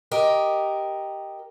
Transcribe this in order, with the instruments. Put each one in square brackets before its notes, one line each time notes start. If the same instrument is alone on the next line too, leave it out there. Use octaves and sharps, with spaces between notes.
[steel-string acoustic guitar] G4 A#4 D#5